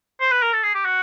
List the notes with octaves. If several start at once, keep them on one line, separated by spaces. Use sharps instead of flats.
C5
B4
A#4
A4
G#4
G4
F#4